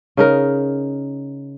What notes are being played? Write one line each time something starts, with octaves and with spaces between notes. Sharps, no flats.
C#3 D#4 A#4